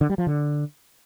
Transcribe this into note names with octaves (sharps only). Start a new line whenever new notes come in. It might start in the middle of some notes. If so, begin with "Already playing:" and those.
D3
G3
F3
D3